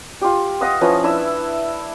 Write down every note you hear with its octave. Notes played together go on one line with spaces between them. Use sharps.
F4 G4
D#5 F5 F#5 D#6
F3 C#4 E4 B4
D4 E4 E5